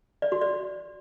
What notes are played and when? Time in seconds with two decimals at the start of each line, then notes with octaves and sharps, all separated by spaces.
0.22 D5
0.32 F#4
0.41 D5